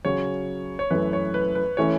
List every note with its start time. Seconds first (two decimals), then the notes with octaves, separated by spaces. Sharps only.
0.05 C#3 F#3 C#4 F#4 C#5
0.79 C#5
0.90 F#2 E3 A3 B4
1.13 C#5
1.34 B4
1.55 B4
1.77 E3 A3 C#4 C#5